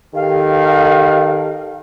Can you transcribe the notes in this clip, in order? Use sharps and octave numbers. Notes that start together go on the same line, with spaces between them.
D#3 G4 A4 F5